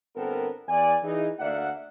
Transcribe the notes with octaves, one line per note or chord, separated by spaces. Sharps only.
G1 B3 C4 A4 A#4
E2 D5 G#5
E3 D#4 G#4
D2 A#3 D5 E5 F#5